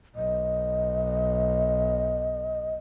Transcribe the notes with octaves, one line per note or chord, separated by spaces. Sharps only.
B1 D#5